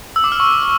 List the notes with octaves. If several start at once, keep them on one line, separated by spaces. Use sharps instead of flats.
E6
D6
F6
C#6